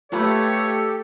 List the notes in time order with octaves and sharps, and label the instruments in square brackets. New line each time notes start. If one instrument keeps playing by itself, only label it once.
[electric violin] A3 [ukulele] F4 B4 B5 [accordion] G4 A4 [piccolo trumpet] C#5